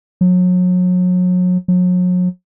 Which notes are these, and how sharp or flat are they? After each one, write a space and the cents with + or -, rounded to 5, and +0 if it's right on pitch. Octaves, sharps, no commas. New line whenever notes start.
F#3 -35
F#3 -40